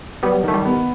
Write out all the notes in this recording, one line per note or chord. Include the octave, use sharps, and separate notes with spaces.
F#3 G3 B3
D#3 A3
G3
B3